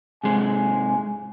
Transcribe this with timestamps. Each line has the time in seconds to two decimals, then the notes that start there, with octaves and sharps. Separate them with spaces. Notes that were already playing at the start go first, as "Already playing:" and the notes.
0.23 G#2 C3 G#3 G#5